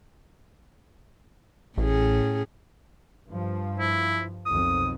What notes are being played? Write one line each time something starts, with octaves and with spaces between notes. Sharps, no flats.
A1 A2 C#4 G#4
G2 F3
E4
B1 F2 D#3 D#6